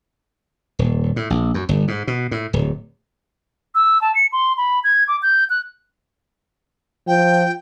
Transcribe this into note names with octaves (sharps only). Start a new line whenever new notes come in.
D#1
A2
A#1
F#2
G1
G#2
B2
A2
D1
E6
A5
C#7
C6
B5
G#6
D6
G6
F#6
F3 G5